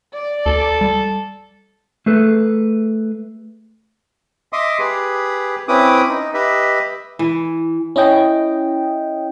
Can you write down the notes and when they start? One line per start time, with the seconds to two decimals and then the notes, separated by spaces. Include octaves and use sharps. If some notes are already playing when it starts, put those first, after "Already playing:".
0.14 D5
0.46 D2 A4
0.81 G3
2.06 A3 G#4 A4 B4
4.53 D#5 E5 C6 D6 D#6
4.79 G4 G#4 B4
5.68 C4 C#4 E4 B4 D6 D#6
6.09 D#4
6.34 G4 B4 D#5 E5
7.19 E3
7.96 C#4 E4 D#5 G5